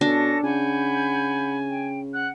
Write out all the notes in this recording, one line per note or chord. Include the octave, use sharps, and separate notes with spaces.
B2 C#4 D4 A4 A#6
C#3 F#5 G#5 B5 G6
G5
F#5 F#6